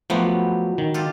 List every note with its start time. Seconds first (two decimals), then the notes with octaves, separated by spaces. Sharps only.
0.10 F3 F#3 A3 B3 G4 B4
0.78 D#3
0.94 F4 G4 A4